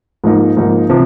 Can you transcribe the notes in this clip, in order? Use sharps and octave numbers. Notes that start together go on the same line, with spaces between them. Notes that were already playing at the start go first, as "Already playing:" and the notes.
G#2 F3 A#3 D#4
G#2 F3 A#3 D#4
C3 F3